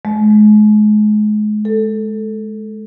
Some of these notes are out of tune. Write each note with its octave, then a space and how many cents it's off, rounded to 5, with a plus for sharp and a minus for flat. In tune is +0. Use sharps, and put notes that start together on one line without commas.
G#3 +35
A4 +0